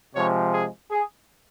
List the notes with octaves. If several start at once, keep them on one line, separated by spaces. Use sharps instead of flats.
C3 F3 G#3 C#5
G#4
G#4